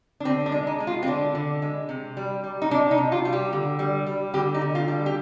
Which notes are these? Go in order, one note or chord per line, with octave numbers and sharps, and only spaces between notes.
D4
D3 C4
D4
G#3
D#4
G#3
F4
C4
D3 D4
D3
G#3
C3
G3
G3
D#4
C3 D4
D#4
C3
F4
G3
G4
D3
G3
G3
D3 G4
D#4
D3
F4
G3
G4